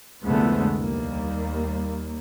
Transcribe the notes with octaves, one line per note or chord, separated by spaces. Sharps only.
C2 F2 D3 G#3 A3 B3
D#2 G3 A#3